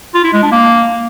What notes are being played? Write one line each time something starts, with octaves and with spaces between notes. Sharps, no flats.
F4
E4
G#3
D4
A#3